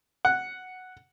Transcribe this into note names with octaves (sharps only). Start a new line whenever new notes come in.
F#5